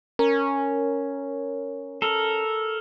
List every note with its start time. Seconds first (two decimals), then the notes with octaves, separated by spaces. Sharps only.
0.19 C#4 A#4
2.02 A4 A#4